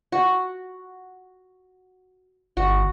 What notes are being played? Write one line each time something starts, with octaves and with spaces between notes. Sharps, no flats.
F#4
G1 F#4